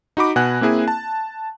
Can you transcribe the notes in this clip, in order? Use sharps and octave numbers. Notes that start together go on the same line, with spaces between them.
D#4 F#4 B5 D6
B2 F#5 G#5 B5 F#6
A#3 C4 E4 G#4 G#5
A5